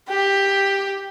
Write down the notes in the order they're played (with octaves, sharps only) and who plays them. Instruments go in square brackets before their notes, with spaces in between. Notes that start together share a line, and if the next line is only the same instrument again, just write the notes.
[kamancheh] G4